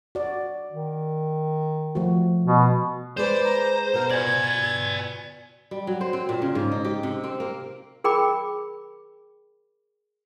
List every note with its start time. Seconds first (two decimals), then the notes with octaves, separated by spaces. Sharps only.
0.15 F#4 D5
0.71 D#3
1.95 F3 A3 F#4
2.45 B2
3.17 G#3 G#4 B4 C5 D5
3.44 A#5
3.93 B2 F#4 A#4
4.10 D5 G#5 G#6
5.71 G3
5.87 F#3
6.01 C5
6.13 C4
6.29 A#2
6.42 C#3
6.55 G#2
6.71 D#4
6.85 G4
7.03 C3
7.24 C4
7.40 A#3
8.04 G#4 A#4 G5 B5 D6